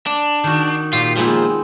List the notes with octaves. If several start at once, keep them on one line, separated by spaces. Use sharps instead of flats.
D4
D#3 F#4
A#2 F4 G4
A#2 F3 G#3 B3 C4